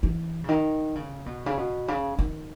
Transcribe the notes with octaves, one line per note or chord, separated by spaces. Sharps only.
E3
C#3
D#3
C#3
B2
C#3
B2
C#3
D#3